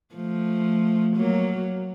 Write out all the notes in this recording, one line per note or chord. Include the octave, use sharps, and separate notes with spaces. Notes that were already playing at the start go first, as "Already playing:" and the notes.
F3 A3
F#3 A#3